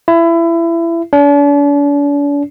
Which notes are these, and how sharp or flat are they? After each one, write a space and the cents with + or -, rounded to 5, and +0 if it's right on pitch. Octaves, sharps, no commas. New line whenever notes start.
E4 +25
D4 -45